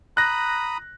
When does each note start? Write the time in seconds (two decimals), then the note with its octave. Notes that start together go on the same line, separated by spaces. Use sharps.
0.17 A#5 B5 D#6 F#6 A#6